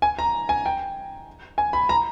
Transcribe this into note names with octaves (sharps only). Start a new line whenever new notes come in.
G#5
A#5
G#5
G5
G#5
B5
A#5